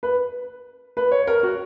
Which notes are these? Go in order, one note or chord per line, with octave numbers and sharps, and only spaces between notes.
B4
B4
C#5
A#4
F#4